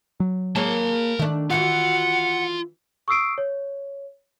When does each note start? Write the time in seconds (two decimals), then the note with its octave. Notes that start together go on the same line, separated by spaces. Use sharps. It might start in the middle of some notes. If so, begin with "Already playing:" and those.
0.20 F#3
0.56 A#3 G#4 A#4 C#5 A5
1.19 D#3 A3 D4
1.50 E3 F4 F#4 F#5
3.08 C#6 D#6 E6 C7 D7
3.38 C#5